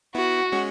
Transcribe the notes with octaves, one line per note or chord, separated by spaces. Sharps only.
B3 E4 F#4
G#3 C#4